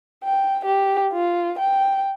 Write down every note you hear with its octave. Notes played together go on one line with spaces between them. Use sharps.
G5
G4
F4
G5